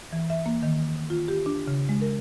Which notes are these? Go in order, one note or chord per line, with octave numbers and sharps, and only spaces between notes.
E3
E5
A#3
D#3
F4
G4
D4
C#3
G#3
A#4